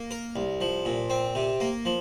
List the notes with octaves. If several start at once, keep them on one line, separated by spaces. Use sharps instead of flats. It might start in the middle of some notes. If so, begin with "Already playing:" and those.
Already playing: A#3
A#4
C2
F3
A#2
C4
C3
A#3
F3